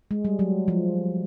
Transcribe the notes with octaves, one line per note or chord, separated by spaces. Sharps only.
G#3
G3
F#3
F3